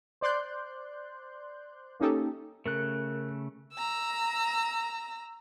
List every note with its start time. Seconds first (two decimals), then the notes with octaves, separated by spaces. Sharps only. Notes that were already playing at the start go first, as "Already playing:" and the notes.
0.21 C5 D5 C6 F#6 G6
2.00 A#3 C#4 D#4 G4 A4
2.66 C#3 A3 A#4 F#6
3.74 A#5 E6